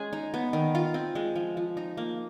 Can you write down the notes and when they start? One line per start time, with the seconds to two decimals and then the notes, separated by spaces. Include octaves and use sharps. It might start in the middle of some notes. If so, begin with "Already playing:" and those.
Already playing: G#3 C#4 G#4
0.13 D#4
0.34 B3
0.53 D#3
0.75 F4
0.94 C4
1.15 G#3
1.36 F3
1.57 F3
1.77 D#4
1.97 A#3